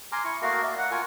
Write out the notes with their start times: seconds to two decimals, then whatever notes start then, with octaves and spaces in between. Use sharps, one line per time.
0.12 G#5 A#5 C6 D6 F6
0.24 E4 C#6
0.42 A3 A#3 F#4 A#4 D#5 F5
0.63 D5 E5
0.78 F#5
0.91 F4 A#4 G#5 C#6